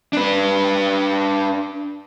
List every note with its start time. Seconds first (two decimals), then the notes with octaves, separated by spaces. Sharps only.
0.13 D4 B4